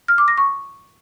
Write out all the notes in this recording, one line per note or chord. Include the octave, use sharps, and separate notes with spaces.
F6
D6
A#6
C#6